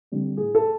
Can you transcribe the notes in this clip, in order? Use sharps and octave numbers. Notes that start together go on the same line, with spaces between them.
D3 G3 C4
A2 G#4
A4